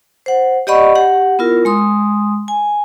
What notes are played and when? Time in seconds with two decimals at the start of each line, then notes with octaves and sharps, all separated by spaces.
0.26 C5 F#5
0.67 G4 D5 D#5 F#5 B5 C#6
0.95 G4 F#5
1.39 B3 E4 F4 A#4
1.65 G#3 C6 D#6
2.48 G#5